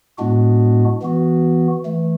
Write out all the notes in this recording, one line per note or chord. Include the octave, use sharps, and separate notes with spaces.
A2 G#3 B3 D4 F#4
E3 B3 F#4
E3 A3